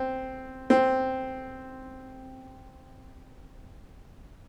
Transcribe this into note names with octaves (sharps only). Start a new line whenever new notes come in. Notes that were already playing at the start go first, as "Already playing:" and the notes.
Already playing: C4
C4